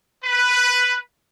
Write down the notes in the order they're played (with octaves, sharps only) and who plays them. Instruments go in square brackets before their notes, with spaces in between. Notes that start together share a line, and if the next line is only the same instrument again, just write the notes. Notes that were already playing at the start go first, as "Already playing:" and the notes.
[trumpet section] B4